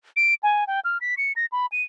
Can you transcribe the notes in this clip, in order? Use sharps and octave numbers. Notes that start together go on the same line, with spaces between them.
D7
G#5
G5
F6
B6
C#7
A#6
B5
D#7